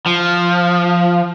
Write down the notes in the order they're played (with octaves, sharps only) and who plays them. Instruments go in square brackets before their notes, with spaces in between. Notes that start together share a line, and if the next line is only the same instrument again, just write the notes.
[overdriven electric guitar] F3